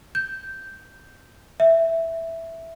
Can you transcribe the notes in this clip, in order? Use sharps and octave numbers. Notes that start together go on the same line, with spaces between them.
G6
E5